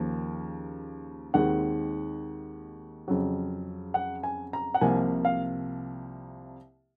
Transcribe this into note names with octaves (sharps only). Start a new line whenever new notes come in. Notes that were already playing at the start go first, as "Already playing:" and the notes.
Already playing: D#2 C#3 F3 A#3
D#2 D#3 G#3 C4 F#5
F2 C#3 F#3
F#5
G#5
A#5
F#5
C2 C3 F3 A#3 G#5
F5